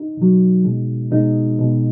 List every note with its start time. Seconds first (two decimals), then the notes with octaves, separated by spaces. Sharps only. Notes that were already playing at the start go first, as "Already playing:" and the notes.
Already playing: D#4
0.17 B2 F#3
0.64 B2 G#3
1.12 B2 G#3 D#4
1.59 B2 G#3